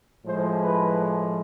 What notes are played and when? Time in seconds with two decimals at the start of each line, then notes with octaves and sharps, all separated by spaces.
0.24 A2 F3 G#3 C5
0.61 B4